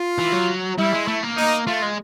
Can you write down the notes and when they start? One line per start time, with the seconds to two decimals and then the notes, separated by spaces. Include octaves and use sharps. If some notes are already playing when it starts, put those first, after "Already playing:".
Already playing: F4
0.18 E3
0.33 F#3
0.78 G3 E4
0.93 G#3
1.08 A3
1.23 A#3
1.37 D#4
1.67 A3 F4
1.82 G#3